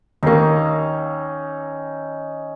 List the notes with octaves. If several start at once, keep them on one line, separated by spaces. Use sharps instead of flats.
D#2 A#3 C#4 D#4